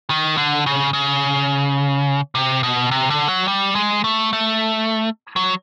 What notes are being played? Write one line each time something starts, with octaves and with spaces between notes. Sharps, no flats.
D#3
D3
C#3
C#3
C3
B2
C3
D3
F#3
G3
G#3
A3
A3
F#3